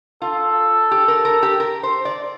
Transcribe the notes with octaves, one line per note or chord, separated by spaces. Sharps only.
F4 A4
G4
A#4
A#4
G4
A#4
C5
D5